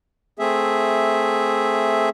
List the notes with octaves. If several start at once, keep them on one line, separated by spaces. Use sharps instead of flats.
A3 C4 G#4 E5